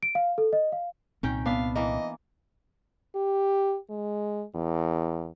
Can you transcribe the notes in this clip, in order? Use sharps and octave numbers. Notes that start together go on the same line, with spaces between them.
D7
F5
A4
D#5
F5
C2 A#2 D#3 C4 C#4 G5
B3 D4 E5 F5
E3 A#3 D#5
G4
G#3
E2